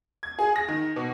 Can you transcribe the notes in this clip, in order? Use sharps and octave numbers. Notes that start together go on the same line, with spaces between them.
G#6
G#4
A#6
D#3
B2